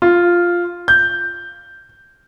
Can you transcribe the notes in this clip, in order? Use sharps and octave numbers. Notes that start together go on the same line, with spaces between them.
F4
G6